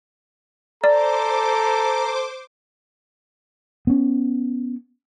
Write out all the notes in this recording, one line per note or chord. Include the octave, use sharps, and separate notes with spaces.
A4 C5 D5 A#5 D6
B3 C#4